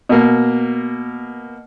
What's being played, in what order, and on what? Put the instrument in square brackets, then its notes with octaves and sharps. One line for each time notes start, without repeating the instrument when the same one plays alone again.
[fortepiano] B2 A#3